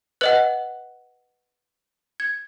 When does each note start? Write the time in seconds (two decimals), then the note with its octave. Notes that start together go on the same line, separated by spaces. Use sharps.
0.21 B4 D#5 F#5 F#6
2.20 G#6